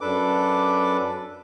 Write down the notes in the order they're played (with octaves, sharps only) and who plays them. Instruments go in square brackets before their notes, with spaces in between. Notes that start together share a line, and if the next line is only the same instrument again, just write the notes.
[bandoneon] F#2 D4 A4 B4 D6